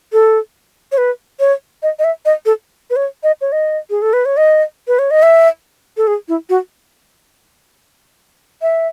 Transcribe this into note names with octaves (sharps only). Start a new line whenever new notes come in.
A4
C#5
B4
C#5
D#5
D#5
E5
D#5
A4
B4
C#5
D#5
C#5
D#5
G#4
A4
B4
C#5
D#5
B4
C#5
D#5
E5
A4
G#4
E4
F#4
E5